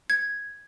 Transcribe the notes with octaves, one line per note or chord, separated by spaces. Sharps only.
G#6